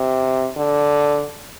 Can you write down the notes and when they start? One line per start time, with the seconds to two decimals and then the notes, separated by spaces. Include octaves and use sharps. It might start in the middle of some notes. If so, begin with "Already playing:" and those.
Already playing: C3
0.57 D3